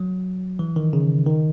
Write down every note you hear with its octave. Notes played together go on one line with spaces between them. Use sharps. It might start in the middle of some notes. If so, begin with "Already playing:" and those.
Already playing: F#3
E3
D#3
C#3
D#3